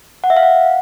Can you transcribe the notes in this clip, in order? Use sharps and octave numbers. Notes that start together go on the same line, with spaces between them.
F#5
E5
F5
F#5